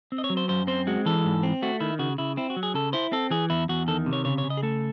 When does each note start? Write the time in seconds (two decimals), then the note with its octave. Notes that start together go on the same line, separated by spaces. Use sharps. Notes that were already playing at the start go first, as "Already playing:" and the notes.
0.12 C4
0.18 D#5
0.24 C#5
0.30 F#3
0.37 C5
0.49 F#2 C5
0.67 C4 C5
0.87 G#3 F#4
1.06 E3 A4
1.25 G#2
1.43 C4
1.62 A3 F#4
1.80 D#3 E4
1.99 C#3 F#4
2.18 C#3 E4
2.37 C4 E4
2.50 F#4
2.56 F#3
2.63 G#4
2.74 C#3 A4
2.93 E4 C5
3.12 C4 A4
3.31 E3 G#4
3.50 E2 E4
3.69 E2 F#4
3.88 D#3 A4
4.06 C3
4.13 C#5
4.25 C#3 C#5
4.38 C#5
4.44 C#3
4.50 D#5
4.57 G#4
4.63 A3 A4